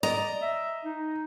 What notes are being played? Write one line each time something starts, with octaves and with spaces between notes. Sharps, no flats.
D5 D#5 A#5
E5
D#4